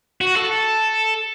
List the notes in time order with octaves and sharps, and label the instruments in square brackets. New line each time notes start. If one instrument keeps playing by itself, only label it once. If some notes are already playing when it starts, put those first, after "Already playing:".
[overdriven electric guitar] F#4
A4